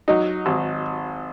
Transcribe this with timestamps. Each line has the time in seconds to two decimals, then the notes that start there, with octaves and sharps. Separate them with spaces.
0.08 F#3 D#4
0.46 G#1